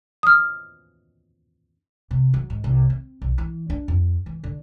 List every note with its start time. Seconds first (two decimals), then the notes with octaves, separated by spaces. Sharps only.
0.23 D#6 F6
2.11 C3
2.34 F#3
2.50 G#2
2.64 C2
2.90 C4
3.22 B1
3.38 E3
3.70 D4
3.88 F2
4.26 E3
4.44 D3